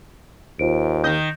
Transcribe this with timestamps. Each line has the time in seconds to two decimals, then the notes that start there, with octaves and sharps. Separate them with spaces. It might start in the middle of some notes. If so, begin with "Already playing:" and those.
0.59 D#2 F4 C5 D7
1.04 D#3 D#5 G6